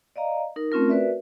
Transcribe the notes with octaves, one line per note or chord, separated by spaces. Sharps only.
D5 D#5 F5 A#5
D#4 A#4
A3 C4 C#4 F4 A#4
F#4 A#4 B4 D5 E5